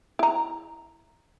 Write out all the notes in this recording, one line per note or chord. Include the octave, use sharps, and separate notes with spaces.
E4 A#5